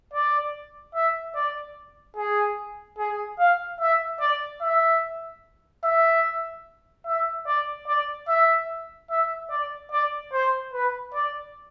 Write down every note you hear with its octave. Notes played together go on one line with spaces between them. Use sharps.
D5
E5
D5
G#4
G#4
F5
E5
D5
E5
E5
E5
D5
D5
E5
E5
D5
D5
C5
B4
D5